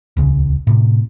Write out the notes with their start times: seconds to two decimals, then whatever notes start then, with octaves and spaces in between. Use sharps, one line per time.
0.17 D#1 C#2 C#3
0.67 A2 C3